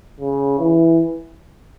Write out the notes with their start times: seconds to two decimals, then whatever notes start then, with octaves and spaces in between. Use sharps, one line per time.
0.21 C#3
0.59 E3